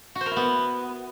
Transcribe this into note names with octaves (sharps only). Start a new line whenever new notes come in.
F#4
C5
A#4
E4
B3